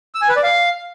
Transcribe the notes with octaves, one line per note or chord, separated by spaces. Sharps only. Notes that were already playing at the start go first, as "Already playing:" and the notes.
E6
G#5
B4
D5
F5